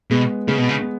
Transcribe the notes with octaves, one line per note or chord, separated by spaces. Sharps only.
B2 G#3 B3
C#3 G#3 B3
B2
C#3
B3